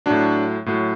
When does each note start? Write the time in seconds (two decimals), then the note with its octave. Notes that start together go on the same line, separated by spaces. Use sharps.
0.06 A2 F#3 D4
0.66 A2 F#3